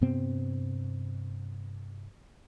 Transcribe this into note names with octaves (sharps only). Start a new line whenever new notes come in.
G2 C3 B3 C4